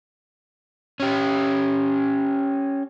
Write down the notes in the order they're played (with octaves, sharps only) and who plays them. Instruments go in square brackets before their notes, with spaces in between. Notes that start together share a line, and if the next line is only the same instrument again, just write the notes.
[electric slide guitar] C#4 G4